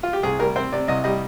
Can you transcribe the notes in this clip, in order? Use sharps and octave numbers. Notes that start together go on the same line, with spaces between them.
F4
G4
C2 G#4
G3 A#4
C4 C5
C3 D5
C2 D#5
G3 D#5